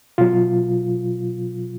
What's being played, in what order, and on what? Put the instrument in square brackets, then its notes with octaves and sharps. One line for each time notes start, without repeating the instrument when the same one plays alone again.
[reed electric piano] B2 F#3 F4